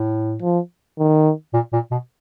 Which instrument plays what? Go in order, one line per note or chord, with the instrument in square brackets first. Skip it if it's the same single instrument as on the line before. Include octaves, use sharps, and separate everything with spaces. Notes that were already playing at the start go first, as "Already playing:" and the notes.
Already playing: [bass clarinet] A2
[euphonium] F3
D#3
[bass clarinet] A#2
A#2
B2